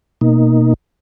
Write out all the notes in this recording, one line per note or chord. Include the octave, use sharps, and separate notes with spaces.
B2 A#3 D#4